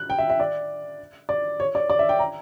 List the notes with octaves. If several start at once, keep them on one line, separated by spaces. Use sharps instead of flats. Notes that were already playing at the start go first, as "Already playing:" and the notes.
Already playing: F#6
G5
E5
E5
D5
D5
C#5
D5
D5
E5
G5
A#5